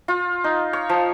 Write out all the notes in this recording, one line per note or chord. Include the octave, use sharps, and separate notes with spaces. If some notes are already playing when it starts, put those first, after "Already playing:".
F4
D#4
C#5
F3